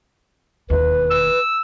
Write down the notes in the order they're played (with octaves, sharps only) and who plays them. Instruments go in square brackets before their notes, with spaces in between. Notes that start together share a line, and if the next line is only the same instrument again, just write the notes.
[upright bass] E1 D#2 [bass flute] B4
[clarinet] E6